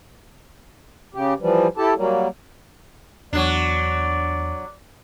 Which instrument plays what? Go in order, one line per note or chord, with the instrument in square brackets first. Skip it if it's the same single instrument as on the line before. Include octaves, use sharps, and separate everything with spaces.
[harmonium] C#3 G4
E3 F3 G3
E4 G4 A4 A5
F#3 G3 A#3
[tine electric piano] E2 [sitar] F#3 D4 [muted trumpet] D5